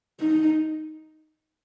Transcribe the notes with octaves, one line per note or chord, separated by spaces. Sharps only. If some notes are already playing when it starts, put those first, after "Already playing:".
D#4